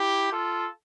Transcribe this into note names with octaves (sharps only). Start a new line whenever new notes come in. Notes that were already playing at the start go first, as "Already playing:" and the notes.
Already playing: E4 G4
F4 A4